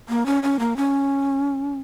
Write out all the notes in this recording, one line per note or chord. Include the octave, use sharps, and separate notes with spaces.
A#3
C#4
C#4
A#3
C#4